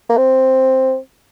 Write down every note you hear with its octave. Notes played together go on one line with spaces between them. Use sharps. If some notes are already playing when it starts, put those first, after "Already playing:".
A#3
C4